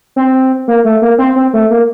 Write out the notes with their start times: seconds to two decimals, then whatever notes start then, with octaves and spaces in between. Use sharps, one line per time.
0.16 C4
0.68 A#3
0.85 A3
1.02 A#3
1.18 C4
1.36 C4
1.53 A3
1.70 A#3